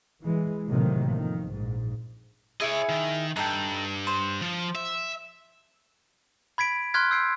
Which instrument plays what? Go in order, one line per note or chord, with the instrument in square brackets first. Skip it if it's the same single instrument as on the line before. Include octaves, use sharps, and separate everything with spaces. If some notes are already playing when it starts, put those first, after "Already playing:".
[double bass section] E3 G#3
A2 C3 D#3 E3 F#3 A#3
F2 D#3
A#1 G#2
[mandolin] E4 G#4 [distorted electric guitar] C#5 D#5
[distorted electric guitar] D#3
[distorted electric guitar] G2 [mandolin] D#4 A4 G5
[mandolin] C5
[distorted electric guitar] F3
E5
[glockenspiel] B5 G#6 B6 D7
B5 C6 F6 F#6 G#6 B6
E6 G6 C7 D7